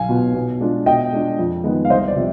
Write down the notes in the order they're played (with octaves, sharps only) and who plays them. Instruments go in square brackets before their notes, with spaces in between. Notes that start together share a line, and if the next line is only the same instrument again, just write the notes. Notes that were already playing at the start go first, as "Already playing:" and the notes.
Already playing: [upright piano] B1 F5 G#5
B2 B3 F4
B2
G#3 D4 F4
B2 D#5 G5
G#3 D4 F4
F2
D#3 G#3 B3 D#4
F5
C2 C5 D#5
D5
C3 F3